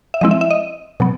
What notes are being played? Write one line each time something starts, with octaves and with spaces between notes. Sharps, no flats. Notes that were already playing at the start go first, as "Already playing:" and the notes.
E5
F3 G#3 C4 E4 D#5
E5
E5
D#5
B2 F#3 B3